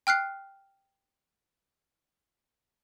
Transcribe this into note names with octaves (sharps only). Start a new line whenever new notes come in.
G5 F6 F#6 C7